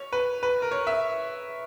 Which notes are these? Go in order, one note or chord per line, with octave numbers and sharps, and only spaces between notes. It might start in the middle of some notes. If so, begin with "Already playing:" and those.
Already playing: C#5
B4
B4
A#4
C#5
E5